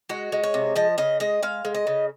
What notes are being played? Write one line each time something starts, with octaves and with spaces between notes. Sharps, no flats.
G#3 F#4
G#3
C#5
C3
F3 D#5
C#3 D#5
G#3 D#5
G#3 F5
G#3
D#5
C#3